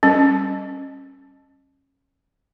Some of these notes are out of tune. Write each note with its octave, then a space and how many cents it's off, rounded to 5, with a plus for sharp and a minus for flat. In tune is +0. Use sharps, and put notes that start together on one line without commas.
G3 -10 C#4 -25